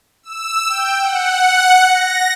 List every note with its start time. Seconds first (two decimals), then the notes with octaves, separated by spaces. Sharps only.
0.23 E6
0.69 G5
1.01 F#5
1.86 A#6